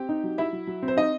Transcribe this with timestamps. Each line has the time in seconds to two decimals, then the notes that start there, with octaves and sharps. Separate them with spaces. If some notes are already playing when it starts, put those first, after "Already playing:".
Already playing: C4 G4 G5
0.09 D#4
0.24 F#3
0.38 F#3 E4 E5
0.53 F#3
0.67 F#3
0.83 C4
0.88 C5
0.97 D#4 D#5